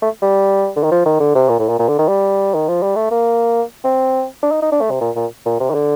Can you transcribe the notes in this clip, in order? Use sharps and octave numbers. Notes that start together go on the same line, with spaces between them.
A3
G3
D3
D#3
F3
D#3
D3
C3
A#2
A2
A#2
A#2
D3
D#3
G3
D#3
F3
G3
A3
A#3
C4
D4
D#4
D#4
D4
A3
C3
A#2
A#2
A#2
C3
D#3
D3